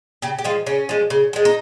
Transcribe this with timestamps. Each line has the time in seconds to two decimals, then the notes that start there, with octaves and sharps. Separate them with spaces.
0.22 C#3 G4
0.38 G4
0.44 F3 G#3 F4
0.66 C#3 C#4
0.89 F3 G#3
1.10 C#3
1.33 F3 G#3
1.45 D#4